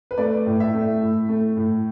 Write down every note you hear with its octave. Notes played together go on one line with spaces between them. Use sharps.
B4
A3 D5
A2
E5
A3
A2
A3
A2